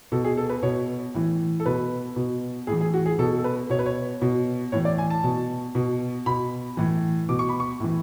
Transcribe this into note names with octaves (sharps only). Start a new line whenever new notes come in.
B2 A4
G#4
A4
B4
B2 C#5
A2 E3
A4
B2 B4
B2
A2 E3 G#4
G#4
F#4
G#4
B2 A4
A4
B4
B2 C#5
B4
C#5
B2
A2 E3 C#5
D5
G#5
A5
B2
B2
B2 B5
A2 E3
B2 D6
C#6
B5
C#6
A2 E3